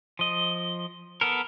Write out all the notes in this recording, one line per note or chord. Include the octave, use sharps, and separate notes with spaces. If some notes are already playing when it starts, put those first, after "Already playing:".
F3 D#5
B3 A4 A#4